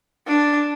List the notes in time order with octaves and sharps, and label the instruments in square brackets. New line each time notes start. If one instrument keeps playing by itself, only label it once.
[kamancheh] D4